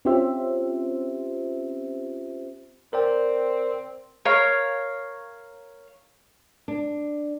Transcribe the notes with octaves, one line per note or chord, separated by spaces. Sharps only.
C4 C#4 F4 G4 C5 E5
C4 A#4 D5 G5
A#4 C#5 F5
D4